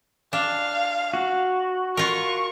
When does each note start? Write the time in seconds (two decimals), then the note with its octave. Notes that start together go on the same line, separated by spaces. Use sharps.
0.33 D4 F5
1.14 F#4
1.97 F4 A#4 C#6